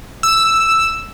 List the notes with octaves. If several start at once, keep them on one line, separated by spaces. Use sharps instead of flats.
E6